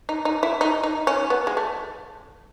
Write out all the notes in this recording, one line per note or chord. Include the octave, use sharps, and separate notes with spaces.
D#4
D#4
E4
D#4
D#4
C#4
B3
G#3
A3